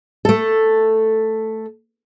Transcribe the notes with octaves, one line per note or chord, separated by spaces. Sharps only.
A3 A4